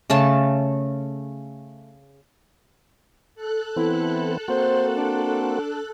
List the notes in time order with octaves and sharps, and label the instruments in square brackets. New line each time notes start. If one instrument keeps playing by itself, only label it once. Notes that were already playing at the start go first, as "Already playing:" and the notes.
[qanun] C#3 A3 A5
[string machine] A4 F#6
[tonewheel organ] E3 B3 C4 [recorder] E4
[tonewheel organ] A#3 C4 F#4 [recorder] C5
[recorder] D4